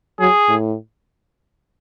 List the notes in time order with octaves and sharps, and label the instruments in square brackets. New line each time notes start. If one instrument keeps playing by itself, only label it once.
[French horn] F#3 [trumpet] G#4
[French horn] A2